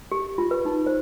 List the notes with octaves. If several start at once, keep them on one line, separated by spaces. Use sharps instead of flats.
G4
F4
B4
D#4
C5